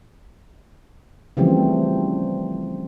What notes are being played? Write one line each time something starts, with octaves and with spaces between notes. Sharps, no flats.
C#3 E3 F3 G3 A3 C4